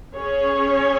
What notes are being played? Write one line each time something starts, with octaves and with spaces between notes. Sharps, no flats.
C#4 G#4 C#5